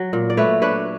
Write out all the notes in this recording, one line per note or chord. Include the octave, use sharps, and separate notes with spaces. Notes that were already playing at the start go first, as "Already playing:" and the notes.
Already playing: F#3
A#2
D5
A3 B4 C#5
D4 B4 C#5